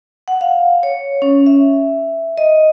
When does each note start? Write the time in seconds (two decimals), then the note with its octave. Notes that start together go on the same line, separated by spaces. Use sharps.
0.28 F#5
0.41 F5
0.83 C#5
1.22 C#4
1.46 E5
2.38 D#5